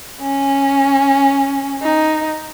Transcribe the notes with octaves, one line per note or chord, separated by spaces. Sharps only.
C#4
D#4